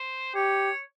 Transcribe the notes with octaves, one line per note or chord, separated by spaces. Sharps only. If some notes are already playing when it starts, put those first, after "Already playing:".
Already playing: C5
G4 C#5